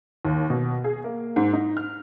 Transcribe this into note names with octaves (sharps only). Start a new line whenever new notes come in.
D#2
B2
G#4
A#3
G#2
D#4
F6